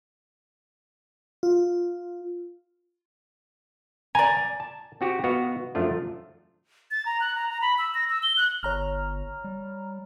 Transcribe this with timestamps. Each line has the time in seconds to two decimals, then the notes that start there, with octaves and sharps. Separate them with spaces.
1.43 F4
4.15 D5 G#5 A#5
4.60 A5
5.01 C4 F#4 G4
5.24 B3 F#4 D#5 F5
5.75 F#2 F3 A3 D4 F4
6.91 A6
7.06 A#5
7.20 F#6
7.35 A#5
7.49 A#5
7.62 B5
7.79 E6
7.95 A#6
8.10 E6
8.23 G7
8.37 F#6
8.63 G1 C#5 A#5 F6
9.44 G3